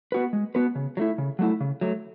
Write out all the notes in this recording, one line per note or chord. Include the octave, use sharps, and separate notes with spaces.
B3 F#4 B4
G#3
B3 F#4 B4
C#3
F#3
A3 E4
C#3
F#3 A3 E4
C#3
F#3 A3